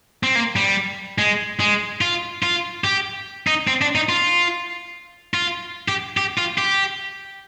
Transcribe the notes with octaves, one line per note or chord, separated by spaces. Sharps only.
C4
A#3
G3
G#3
G#3
F4
F4
G4
D#4
C4
D4
D#4
F4
F4
G4
G4
F4
G4